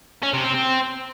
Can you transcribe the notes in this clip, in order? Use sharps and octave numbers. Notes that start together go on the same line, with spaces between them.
C#4
C3
C4
C4